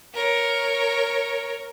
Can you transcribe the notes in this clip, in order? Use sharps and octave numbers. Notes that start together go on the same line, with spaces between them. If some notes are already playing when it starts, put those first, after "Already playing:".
A#4 C#5